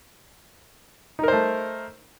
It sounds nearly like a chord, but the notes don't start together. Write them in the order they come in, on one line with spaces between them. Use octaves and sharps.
D#4 A#4 C5 A3